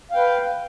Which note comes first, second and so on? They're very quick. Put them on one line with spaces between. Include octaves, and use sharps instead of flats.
F5 G5 B4